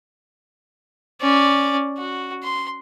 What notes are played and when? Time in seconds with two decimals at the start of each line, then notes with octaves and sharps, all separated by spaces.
1.21 C#4 D5
1.97 F#4
2.43 C6